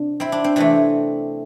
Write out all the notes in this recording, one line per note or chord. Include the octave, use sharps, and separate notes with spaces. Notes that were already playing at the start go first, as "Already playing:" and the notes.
Already playing: C3 D4
C4 E4
D4
C4
C3 E3 A3 D4